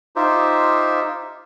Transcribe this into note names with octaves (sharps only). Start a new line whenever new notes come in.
D#4 F4 G4 C5 E5